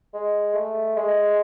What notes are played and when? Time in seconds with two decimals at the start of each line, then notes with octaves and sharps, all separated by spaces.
0.14 G#3
0.54 A3
0.96 G#3